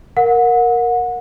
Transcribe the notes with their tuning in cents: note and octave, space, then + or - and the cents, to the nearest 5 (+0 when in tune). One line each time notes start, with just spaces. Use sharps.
A#4 +0 F#5 -30